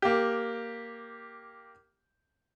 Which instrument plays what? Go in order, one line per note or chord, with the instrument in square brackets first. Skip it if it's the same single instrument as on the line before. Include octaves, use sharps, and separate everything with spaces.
[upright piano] A#3 G4